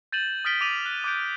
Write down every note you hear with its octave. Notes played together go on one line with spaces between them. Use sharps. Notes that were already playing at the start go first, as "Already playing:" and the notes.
G6 A6 D#7 E7 F#7
D#6 F6 A6 B6 D7 G7
D6 D#6 A6 D#7 F7 F#7
F#6 G7
D6 F#6 G6 D7 D#7